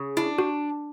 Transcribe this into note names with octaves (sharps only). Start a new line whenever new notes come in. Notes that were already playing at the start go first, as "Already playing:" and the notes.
Already playing: C#3
D4 E4
F#4